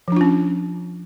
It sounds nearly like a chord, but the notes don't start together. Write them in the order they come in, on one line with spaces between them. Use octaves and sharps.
F3 D4 F4 C#4